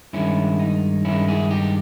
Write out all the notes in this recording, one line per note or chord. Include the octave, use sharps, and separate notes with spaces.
G2 D#3 G#3 C#4 E4
D#4
G2 D#3 G#3 C#4 E4
E4 G#4
D#4 G4